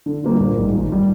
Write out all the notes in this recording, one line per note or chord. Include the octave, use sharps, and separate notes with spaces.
D3
G3 A#3 F4
A#1
G#2 G3
G#1
G3